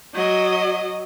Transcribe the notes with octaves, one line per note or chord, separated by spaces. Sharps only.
F#3 D#5